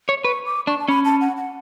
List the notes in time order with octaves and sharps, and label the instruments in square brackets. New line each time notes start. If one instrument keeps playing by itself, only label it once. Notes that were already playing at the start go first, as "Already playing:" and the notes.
[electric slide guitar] C#5
[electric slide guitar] B4 [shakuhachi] C#6
[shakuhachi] D6
[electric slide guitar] D4 [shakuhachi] C#6
[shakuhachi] A5
[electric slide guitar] C#4 [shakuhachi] B5
[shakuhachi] A5
F#5
F#5